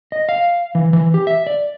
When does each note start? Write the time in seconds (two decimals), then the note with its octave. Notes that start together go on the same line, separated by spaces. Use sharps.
0.12 D#5
0.29 F5
0.75 E3
0.93 E3
1.14 G4
1.27 E5
1.47 D5